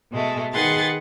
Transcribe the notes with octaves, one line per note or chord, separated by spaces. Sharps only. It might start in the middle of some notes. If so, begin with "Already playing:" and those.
B2 G#3 A3
D#3 G#4 B4 F#5 C6 A6